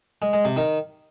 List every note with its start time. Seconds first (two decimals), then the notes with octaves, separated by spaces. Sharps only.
0.22 G#3
0.33 G#3
0.45 C3
0.57 D#3